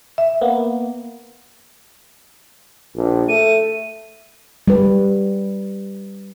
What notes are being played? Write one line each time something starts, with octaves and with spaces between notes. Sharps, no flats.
E5
A#3 B3
A#1
A3 D#7
G3 B4